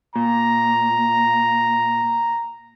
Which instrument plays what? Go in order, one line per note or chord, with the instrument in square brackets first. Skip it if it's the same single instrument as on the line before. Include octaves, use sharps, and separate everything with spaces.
[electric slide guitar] A#2 [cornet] A#5